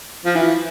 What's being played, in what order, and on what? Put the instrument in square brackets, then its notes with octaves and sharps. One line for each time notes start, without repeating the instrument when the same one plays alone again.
[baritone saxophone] F3
E3